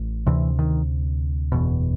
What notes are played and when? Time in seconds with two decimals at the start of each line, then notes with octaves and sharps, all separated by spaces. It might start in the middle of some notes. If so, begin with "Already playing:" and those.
Already playing: A1 A2
0.27 D2 C3 E3
0.59 D#3
1.52 F#1 E2 B2